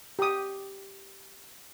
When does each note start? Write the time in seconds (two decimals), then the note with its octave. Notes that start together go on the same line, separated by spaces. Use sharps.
0.19 G4 D#6